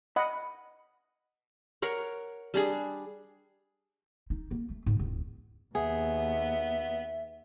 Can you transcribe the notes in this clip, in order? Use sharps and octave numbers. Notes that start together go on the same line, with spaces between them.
D#5 F#5 B5
A#4 C#5 F#5
G3 D4 G#4
D#4
A#3
A3
G#2
D1
D#2 B3 G#4 E5